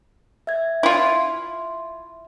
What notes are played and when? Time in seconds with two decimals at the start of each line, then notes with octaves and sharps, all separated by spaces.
0.47 E5 G#6
0.83 E4 F4